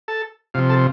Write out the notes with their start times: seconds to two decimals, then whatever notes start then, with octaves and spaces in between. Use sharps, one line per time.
0.08 A4
0.54 C3 F3 F4
0.70 A4